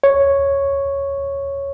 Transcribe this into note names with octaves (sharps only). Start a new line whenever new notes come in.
C#5